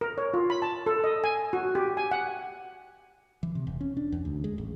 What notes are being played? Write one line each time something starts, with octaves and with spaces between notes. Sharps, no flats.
A#4
C#5
F4
B5
A5
A4
D#5
G#5
F#4
G4
G#5
F#5
E3
C3
E1
C#4
D4
E2
D2
G#3
A1